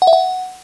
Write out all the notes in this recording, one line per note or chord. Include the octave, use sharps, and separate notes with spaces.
F#5
E5
F#5